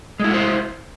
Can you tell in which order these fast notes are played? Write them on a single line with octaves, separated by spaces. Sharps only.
G#3 E4 F#4 C5